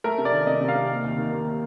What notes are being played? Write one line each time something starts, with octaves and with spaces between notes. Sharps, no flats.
A3 A#4
C3
D5
D#3
C3 D#5
C3
F5
C3
A#3
D#2
D#3
A#3